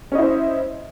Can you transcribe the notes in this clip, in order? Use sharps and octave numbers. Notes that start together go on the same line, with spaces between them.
C#4 E4 C5 D#5